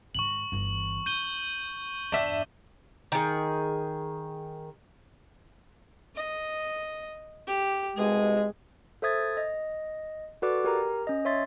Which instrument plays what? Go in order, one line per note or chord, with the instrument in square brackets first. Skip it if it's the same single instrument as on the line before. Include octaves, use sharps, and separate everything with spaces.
[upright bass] G#2 D#3 [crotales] C#6 F#7
[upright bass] G1 E3
[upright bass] D4 [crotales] G6 D#7 G7
[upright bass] E2 G2 [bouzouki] D4 E5 F#5
[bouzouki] D#3 G#4
[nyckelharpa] D#5
G4
[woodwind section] C2 B2 G#3 [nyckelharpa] G#4
[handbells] A4 C5 E5 D#6 G#6 A6
D#5
F#4 A4 B4 D5 D6
G4 A#4 A#5
C#4 D#5
C#5 E5 C6 A6